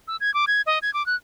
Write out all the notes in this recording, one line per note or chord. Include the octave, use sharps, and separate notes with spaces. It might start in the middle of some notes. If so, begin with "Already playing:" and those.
E6
G#6
D6
G#6
D#5
G#6
D6
F#6